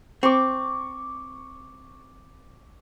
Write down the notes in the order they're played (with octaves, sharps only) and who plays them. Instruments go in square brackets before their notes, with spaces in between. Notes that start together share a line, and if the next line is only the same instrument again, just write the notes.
[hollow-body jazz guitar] C4 [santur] C#6 D6